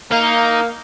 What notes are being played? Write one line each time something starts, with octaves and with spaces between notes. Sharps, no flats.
A#3 D#4